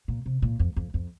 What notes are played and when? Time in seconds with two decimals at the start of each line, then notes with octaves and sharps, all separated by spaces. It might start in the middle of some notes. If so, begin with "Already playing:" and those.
0.08 A#2
0.26 C3
0.42 A#2
0.59 F2
0.76 F2
0.94 F2